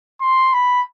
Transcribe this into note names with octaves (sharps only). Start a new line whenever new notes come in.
C6
B5